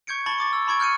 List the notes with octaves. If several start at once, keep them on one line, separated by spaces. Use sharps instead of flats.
C#6 G6 G#6 C#7 D7
A5 B5 C#6 A6 G7
C#6 D6 A6
E6
A5 B5 C#6 G#6 D7
F6 G6 C#7 D#7